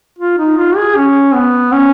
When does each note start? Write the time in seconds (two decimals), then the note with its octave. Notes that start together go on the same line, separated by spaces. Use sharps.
0.19 F4
0.39 D#4
0.58 F4
0.76 G#4
0.96 C#4
1.34 B3
1.73 C#4